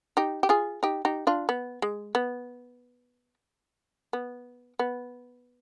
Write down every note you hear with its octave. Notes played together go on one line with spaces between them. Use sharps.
D#4 G4
G4
F4 G#4
D#4 G4
D#4 G4
D4 F4
B3
G#3
B3
B3
B3